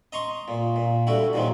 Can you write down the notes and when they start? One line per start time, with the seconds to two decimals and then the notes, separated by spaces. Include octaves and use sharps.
0.13 D#5 A#5 C6 C#6
0.48 A#2
0.76 A#2
1.07 D3 G3 E4 F#4
1.33 F#2 A#2 D#3 F3 F#3